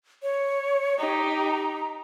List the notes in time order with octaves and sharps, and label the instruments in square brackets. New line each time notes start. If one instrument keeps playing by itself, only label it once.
[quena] C#5
[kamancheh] D#4 G4 [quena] A#5